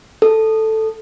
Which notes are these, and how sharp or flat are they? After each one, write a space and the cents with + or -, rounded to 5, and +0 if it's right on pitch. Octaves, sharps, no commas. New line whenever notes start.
A4 +0